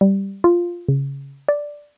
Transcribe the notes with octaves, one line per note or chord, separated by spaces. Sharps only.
G3
F4
C#3
D5